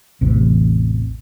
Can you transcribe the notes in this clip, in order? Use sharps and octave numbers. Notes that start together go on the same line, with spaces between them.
A1 E2 C3